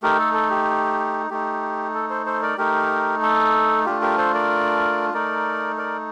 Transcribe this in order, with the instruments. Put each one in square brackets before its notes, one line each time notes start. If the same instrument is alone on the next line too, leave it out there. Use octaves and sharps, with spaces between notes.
[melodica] A3 D#4 G4 A#4
A4
A4
G4
A3 D#4 G4
A4
A4 C5
A4 C5
A#4 D5
A3 D#4 G4 A#4
A4
A3 D4 F4 G4
G4 A#4
A4 C5
A#4 D5
A3 D#4 A#4 D5
A#4 D5